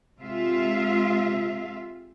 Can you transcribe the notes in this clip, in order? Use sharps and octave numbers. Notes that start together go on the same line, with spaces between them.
C3 G#3 F4 E5 F5